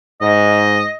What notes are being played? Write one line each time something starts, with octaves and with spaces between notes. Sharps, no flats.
G#2 D#5